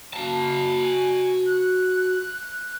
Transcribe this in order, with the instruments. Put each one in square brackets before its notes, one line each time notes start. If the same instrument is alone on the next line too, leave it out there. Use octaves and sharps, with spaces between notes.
[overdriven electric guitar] F#4 A5 [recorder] F5
[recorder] G#5
F#6